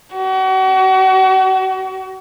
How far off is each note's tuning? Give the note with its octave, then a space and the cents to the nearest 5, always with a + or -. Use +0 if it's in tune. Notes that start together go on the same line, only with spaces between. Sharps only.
F#4 +35